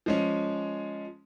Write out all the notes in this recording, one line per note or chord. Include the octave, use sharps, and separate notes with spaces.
F3 G#3 C#4